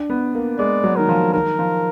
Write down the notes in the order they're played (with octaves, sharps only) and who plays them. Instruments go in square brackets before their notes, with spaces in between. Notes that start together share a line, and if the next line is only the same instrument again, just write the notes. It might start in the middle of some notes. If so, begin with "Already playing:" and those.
Already playing: [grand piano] D4
B3
A#3
[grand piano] G#3 [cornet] D5
[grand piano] F#3
[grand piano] D#3 [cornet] A#4
[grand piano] F3
[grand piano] D#3 [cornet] A#4
[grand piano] F3